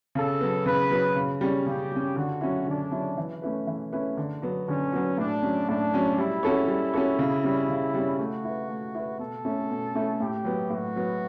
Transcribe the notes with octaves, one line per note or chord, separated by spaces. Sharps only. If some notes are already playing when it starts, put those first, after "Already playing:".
C#3 A4
F#3 B3
C#3 B4
F#3 B3
C#3
G3 C#4
C#3 G4
G3 C#4
D3 F#4
F#3 C#4 E4
D3 D4
F#3 C#4 E4
E3
A3 C#4 E4 B4
E3
A3 C#4 E4 B4
D3
F#3 B3 F#4
D3 C#4
F#3 B3 F#4
A2 D4
F#3 C#4
A2 D4
F#3 C#4
G3 E4
C#4 F#4 A4 C#5
G3
C#4 F#4 A4 C#5
C#3
G3 C#4
C#3
G3 C#4
A3 F#4
E4 B4
A3
E4 B4
B2 A4
A3 C#4 E4
B2
A3 C#4 E4
A2 G4
F#3 B3
A2 F#4
F#3 B3